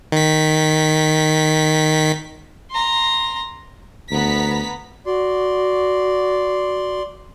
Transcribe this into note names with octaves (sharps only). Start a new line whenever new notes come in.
D#3 B6
A#5 C6
D2 B3 A#5 B6
F#4 D5 C6